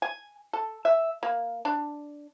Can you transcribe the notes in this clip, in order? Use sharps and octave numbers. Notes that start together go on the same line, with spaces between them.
G#5
A4
E5
A#3
D4